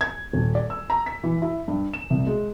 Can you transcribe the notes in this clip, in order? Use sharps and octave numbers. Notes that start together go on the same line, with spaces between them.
G#6
D#1
D5
E6
A#5
B6
E3
E4
G2
E7
C2
G#3